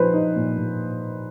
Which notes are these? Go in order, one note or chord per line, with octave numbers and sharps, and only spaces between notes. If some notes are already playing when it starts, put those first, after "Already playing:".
Already playing: A#2 F3 D#4 B4 C5
D#4
A#2
A#2